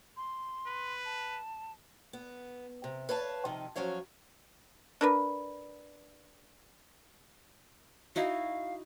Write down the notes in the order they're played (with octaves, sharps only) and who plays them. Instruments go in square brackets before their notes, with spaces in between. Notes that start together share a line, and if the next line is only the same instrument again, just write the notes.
[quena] C6
[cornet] B4
[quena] A5
[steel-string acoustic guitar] B3
C3
B4 C#5 F5 A5
C3 D#3 F3 D#4
F3 F#3 C#4 C#5 F5
[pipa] D4 A#4 B4
[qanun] D#4 E4 F#4 [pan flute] F5